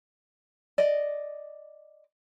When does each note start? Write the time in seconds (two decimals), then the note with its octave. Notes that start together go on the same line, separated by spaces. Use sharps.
0.78 D5 D#5